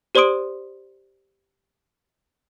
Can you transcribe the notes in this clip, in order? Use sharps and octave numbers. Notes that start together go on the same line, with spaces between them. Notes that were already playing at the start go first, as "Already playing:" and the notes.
G4 C5 D5 C6 D#6 D7